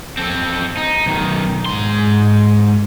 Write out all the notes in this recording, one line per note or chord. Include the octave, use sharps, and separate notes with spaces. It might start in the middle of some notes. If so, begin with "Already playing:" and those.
C4 A4
D#4
B1 D#3
G#2 C6